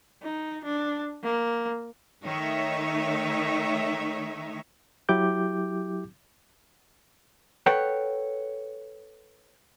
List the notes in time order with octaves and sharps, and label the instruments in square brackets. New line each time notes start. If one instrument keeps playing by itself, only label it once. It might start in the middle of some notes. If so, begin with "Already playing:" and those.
[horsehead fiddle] D#4
D4
A#3
[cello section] D#3 A3 D#4 C#5 E5
[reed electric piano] F#3 E4 G4 D6 G6
[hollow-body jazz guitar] A4 B4 C#5 F#5 G5